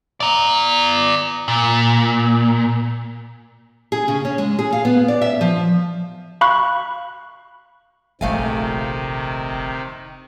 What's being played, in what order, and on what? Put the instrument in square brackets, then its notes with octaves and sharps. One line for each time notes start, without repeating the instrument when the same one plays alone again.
[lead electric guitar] D5 A#5
A#2
[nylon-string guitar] G#4
C#3
C#4
G#3
G#4
F5
B3
D5
E5
F3
[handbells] F5 B5 C#6 F#6
[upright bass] F1 A#1 [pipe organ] C3 D#3 [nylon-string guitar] A3 F5 G#5